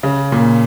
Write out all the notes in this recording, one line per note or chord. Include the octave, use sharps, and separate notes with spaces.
C#3
A#2